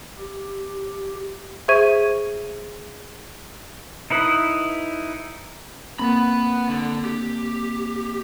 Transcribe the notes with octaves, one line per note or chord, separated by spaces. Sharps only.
G4
G#4 C5 E5 C#6 G#6 D#7
D#4 E4 B4 D#6
A#3 C4 F#5 B5
D3
G4